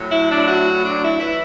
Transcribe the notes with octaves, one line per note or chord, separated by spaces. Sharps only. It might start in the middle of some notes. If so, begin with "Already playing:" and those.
Already playing: A2 F#3
E4
D4
F#4
D4
E4
E3 E4